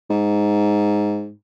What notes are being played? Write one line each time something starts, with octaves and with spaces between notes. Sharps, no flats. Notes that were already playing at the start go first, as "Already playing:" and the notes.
G#2